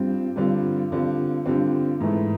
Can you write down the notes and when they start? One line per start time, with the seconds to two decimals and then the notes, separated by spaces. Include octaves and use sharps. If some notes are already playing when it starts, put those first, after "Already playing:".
Already playing: G2 G3 C4 F4
0.36 G2 D3 G3 C4 F4
0.91 G2 D3 G3 C4 F4
1.46 G2 D3 G3 C4 F4
2.01 G#2 E3 A3